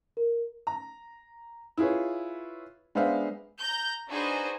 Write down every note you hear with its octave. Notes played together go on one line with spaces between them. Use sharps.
A#4
A#5
E4 F4 G#4 B4 C#5
G#3 B3 D4 C5 E5 F5
A#5 G6
D4 D#4 F#4 G#4 B4 C5